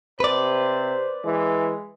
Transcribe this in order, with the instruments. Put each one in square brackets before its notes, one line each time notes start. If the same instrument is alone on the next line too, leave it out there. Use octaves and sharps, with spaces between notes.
[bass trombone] C3 [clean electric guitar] B4 D5 [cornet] C5
[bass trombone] E3 [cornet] G#3